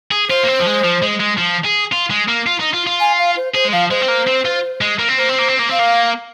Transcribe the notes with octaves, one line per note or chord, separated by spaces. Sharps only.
G#4
F4 C5
A#3
C4
F3
G#3
F3
G#3
G#3
F3
G#4
F4
G#3
A#3
F4
D#4
F4
F4
G#5
F5
C5
G#4 C5
G#3
F3 F5
G#3 C5
C4
A#3
C4
F4
G#3
A#3
C4
A#3 C5
C4
A#3
C4
A#3
C4 F5
A#3